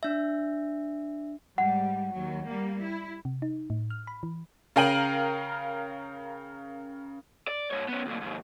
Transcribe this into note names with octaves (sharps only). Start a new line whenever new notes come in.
D4 E5
G#2 G3 F#5
D#2 F#3
G3 A#3
E4
C3
D#4
A2
F6
B5
E3
C#3 A#4 F5 G5 D#7 F#7
D5
G#2 C#5
B3 C#4
D2 A#2
D#2 G#2